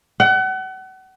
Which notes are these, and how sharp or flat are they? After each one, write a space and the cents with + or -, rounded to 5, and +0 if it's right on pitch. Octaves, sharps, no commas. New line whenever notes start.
F#5 +35